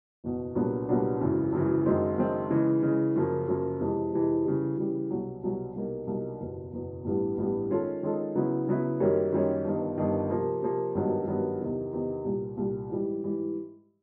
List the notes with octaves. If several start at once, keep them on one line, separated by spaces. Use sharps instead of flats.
F#1 E2 B2
C2 A#2 F#3 B3 D4
C2 A#2 F#3 B3 D4
G#1 F#2 C#3 E3
G#1 F#2 C#3 E3
F#1 F#2 D#3 G#3 C4
F#1 F#2 D#3 G#3 C4
C#3 E3 G#3
C#3 E3 G#3
F#2 C#3 F3 A#3
F#2 C#3 F3 A#3
F2 C3 E3 G#3
F2 C3 E3 G#3
C#3 E3 G3
C#3 E3 G3
C2 B2 F#3
C2 B2 F#3
C2 B2 F#3 A#3 D#4
C2 B2 F#3 A#3 D#4
F#1 E2 B2
F#1 E2 B2
A1 G2 E3 G3 B3
A1 G2 E3 G3 B3
D#3 G#3 C#4 F4 A4
D#3 G#3 C#4 F4 A4
C#3 F#3 B3 E4
C#3 F#3 B3 E4
F#2 D#3 G3 A#3 C#4
F#2 D#3 G3 A#3 C#4
G1 G2 D#3
G1 G2 D#3
C3 F3 A#3
C3 F3 A#3
G#1 G2 D#3 F#3 B3
G#1 G2 D#3 F#3 B3
E2 C3 D#3
E2 C3 D#3
C2 A#2 G3
C2 A#2 G3
G#2 E3 G3
G#2 E3 G3